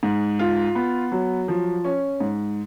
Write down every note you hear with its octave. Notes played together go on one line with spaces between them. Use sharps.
G#2
F4
B3
F#3
F3
C#4
G#2